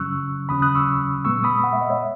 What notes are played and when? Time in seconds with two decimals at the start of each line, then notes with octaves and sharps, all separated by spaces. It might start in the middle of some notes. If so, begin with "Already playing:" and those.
Already playing: F#2 C#3 F#3 C#4 C#6 E6 F#6
0.49 D#2 C#3 F#3 C#4 B5 D#6
0.62 D#6 F#6
0.75 C#6 E6
1.25 A#2 G#3 B3 C#6 E6
1.44 B5 D#6
1.64 F#5
1.73 E5
1.81 D#5
1.90 C#5 E5